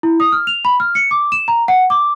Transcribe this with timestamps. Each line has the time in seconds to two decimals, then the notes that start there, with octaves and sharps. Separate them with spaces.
0.03 E4
0.20 D#6
0.32 F6
0.47 F7
0.65 B5
0.80 F6
0.95 C#7
1.11 D6
1.32 E7
1.48 A#5
1.68 F#5
1.90 D6